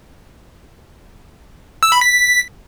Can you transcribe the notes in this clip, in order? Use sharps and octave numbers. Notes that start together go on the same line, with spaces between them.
E6
B5
B6